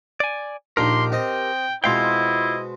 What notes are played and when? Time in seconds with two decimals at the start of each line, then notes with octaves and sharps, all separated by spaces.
0.20 D5 G#5
0.77 A#1 D4 D#4 G4 A#4 C6
1.12 C4 D#5 G5
1.84 B2 G#3 C4 E4 F4 D#5 F5 G5